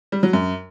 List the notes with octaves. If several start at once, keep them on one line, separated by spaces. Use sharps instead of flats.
G3
F#3
F#2